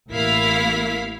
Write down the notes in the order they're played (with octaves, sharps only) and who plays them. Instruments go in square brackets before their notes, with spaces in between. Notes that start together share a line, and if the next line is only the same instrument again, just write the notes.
[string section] A1 A#3 E4 F5 B6